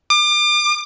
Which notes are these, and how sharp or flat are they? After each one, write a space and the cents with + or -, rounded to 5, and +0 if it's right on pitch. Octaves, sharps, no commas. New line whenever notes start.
D6 +35